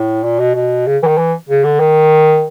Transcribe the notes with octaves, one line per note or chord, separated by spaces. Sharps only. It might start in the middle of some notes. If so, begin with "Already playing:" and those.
Already playing: A2
A#2
B2
B2
C#3
E3
D#3
E3
C#3
D3
D#3